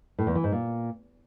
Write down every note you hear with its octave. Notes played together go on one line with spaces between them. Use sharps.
A2
E2
E3
G#2
A#2